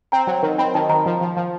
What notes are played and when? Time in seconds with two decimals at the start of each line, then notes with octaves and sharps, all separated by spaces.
0.12 C4 A#5
0.27 F#3
0.43 D#3
0.58 C4 B5
0.74 D#3 A5
0.89 D#3 A#5
1.06 F3
1.21 F3
1.37 F3